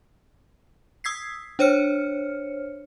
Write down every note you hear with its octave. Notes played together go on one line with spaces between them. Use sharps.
D#6 E6 G#6 B6 C7
D4 C5 C#5 F6 C#7